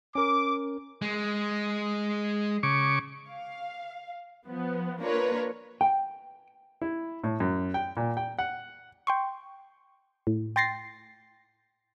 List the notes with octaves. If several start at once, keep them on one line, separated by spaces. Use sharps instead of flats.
C#4 A#4 D6
G#3
C#3 C#6 D6
F5
F3 B3
A#3 D4 F4 A#4 B4 C#5
G5
E4
A2
F#2
G5
A#2
G5
F#5
G5 C6 C#6
A2
G5 C6 A6 A#6 C7